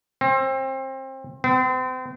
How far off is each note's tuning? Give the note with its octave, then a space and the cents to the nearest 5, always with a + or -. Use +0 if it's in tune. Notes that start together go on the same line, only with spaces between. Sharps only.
C4 +30
C4 -35